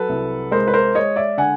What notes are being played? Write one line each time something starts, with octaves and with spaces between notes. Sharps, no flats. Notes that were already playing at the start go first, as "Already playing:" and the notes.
Already playing: F#3 A4 B4
C2
G#3 A#4 C5
B4
A#4 C5
G#3 C#5 D#5
D5 E5
D3 F#5 G#5